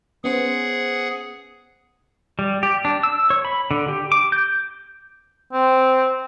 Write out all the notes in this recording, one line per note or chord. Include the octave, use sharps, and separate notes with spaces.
B3 C#4 G#4 C5 F#5
G3
G4
D4
E6
C#5
B5
D3
G4
D6
G6
C4